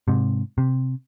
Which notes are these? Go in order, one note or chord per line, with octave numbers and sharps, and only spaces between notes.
G#2 C3
C3